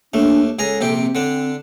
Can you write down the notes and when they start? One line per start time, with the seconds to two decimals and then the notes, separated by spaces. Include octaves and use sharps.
0.14 D#2 A3 D4
0.59 C#2 G#4 A4 A#5
0.81 A#1 C3 G4
0.98 C4
1.15 D3 D4